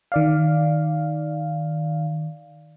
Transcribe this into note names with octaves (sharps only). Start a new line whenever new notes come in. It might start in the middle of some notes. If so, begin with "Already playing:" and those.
D#3 D5 F5